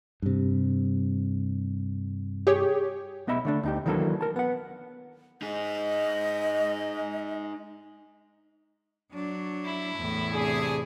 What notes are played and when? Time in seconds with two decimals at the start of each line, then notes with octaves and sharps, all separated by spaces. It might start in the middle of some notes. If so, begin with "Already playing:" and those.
0.22 G2 C3
2.47 G4 G#4 C#5
3.27 B1 B3 D#5 E5 B5
3.45 D3 A3 D4
3.63 D2 D#4 G4
3.86 D#3 E3 F#3 A#3 D4 A4
4.21 A#4 A5
4.36 B3 F#5
5.42 D#4 G#4 D#5
9.12 F#3 D4
9.65 E4
9.96 E2 A2
10.32 C3 D4 G#4